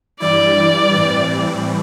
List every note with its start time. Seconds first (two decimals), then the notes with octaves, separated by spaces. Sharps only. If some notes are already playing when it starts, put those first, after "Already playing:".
0.20 G2 E3 G3 E4 D5
0.95 A2 E3 G3 C4